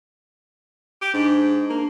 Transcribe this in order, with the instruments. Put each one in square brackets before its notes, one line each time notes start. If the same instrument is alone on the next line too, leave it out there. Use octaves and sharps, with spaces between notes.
[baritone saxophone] G4
[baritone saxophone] G#2 [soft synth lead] D4
[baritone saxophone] A#3 [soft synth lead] D4